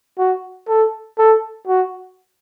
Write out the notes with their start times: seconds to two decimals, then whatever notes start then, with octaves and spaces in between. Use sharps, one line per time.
0.18 F#4
0.68 A4
1.18 A4
1.68 F#4